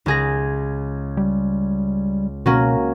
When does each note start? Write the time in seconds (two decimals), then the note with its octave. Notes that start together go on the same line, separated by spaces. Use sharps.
0.06 C#2 G#4 A#6
1.17 G3
2.46 B2 A#3 C#4 F#4